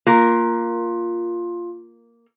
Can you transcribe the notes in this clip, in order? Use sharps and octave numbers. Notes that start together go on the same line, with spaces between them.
A#3 F4 A#4